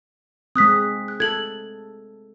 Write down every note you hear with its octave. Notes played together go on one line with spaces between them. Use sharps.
G#3 C4 D#6 F#6 B6
F#6
A4 G#6 F#7